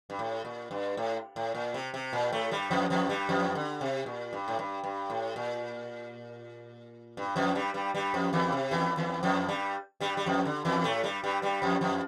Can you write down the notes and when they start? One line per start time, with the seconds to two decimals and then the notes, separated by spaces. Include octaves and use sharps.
0.10 G2
0.19 A2
0.45 A#2
0.71 G2
0.97 A2
1.36 A2
1.55 A#2
1.74 C3
1.94 C3
2.13 A#2
2.32 A2 A3
2.51 G2 G3
2.71 F2 F3
2.90 F2 F3
3.09 G2 G3
3.29 F2 F3
3.55 D3
3.81 C3
4.06 A#2
4.33 G2
4.48 A2
4.59 G2
4.84 G2
5.10 A2
5.36 A#2
7.17 G2
7.36 F2 F3
7.55 G2 G3
7.74 G2 G3
7.95 G2 G3
8.14 F2 F3
8.33 E2 E3
8.52 C3
8.71 E2 E3
8.97 E2 E3
9.23 F2 F3
9.49 G2 G3
10.00 G2 G3
10.17 G3
10.26 F2 F3
10.45 D3
10.65 E2 E3
10.84 A2 A3
11.04 G2 G3
11.24 G2 G3
11.42 G2 G3
11.62 F2 F3
11.81 F2 F3